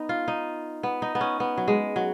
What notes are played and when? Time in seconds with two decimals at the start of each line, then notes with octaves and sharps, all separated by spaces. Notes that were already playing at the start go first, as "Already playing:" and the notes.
Already playing: B3 D#4
0.09 F4
0.28 D#4
0.83 B3
1.02 D#4
1.15 B3
1.21 C#4
1.40 B3
1.58 F#3
1.68 G#3
1.96 F#3